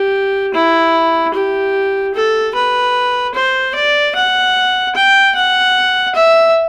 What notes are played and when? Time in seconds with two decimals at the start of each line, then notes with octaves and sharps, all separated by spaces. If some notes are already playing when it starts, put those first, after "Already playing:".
Already playing: G4
0.54 E4
1.34 G4
2.15 A4
2.55 B4
3.35 C5
3.75 D5
4.15 F#5
4.95 G5
5.35 F#5
6.15 E5